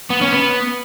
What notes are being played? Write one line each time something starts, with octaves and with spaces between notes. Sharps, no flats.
B3
C#4
B3